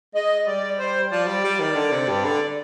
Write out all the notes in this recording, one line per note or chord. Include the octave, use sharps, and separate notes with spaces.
G#3 D#5
G3 D5
C5
F3 D5
G3
G3
D#3
D3
C3
G2
D3